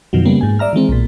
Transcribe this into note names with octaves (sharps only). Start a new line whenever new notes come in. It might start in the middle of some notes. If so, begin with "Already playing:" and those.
F#2 B2 D#3 F3 F#3
C#3 G3 A#3 B3
G#2 G#5
D5 E5 A#5 F6
D#3 E3 G#3 C4
B1 A#2